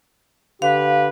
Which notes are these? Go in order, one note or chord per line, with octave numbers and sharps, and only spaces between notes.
D3 G4 B4 F5